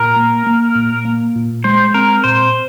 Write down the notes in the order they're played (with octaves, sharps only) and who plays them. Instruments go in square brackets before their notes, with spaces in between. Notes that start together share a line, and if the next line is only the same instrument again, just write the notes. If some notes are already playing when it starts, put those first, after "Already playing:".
Already playing: [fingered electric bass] A#2 [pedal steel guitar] A#4
[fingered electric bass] A#3
A#3
A#2
A#3
A#2
[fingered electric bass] G#3 [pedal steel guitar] C5
[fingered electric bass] C4 [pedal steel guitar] A#4
[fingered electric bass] A#2 [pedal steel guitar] C5